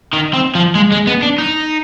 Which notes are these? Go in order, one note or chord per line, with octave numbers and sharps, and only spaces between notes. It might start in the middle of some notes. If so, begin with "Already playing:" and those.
D#3
C4
F3
G#3
G#3
B3
D4
D#4